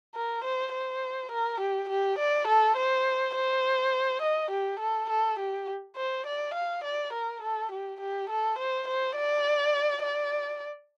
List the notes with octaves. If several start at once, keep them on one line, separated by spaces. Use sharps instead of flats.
A#4
C5
C5
A#4
G4
G4
D5
A4
C5
C5
D#5
G4
A4
A4
G4
C5
D5
F5
D5
A#4
A4
G4
G4
A4
C5
C5
D5
D5